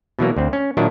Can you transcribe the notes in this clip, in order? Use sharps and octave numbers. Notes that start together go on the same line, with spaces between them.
B2 E3 F#3 A#3
D2 C4
C#4
A#2 D#3 F#3 D4 E4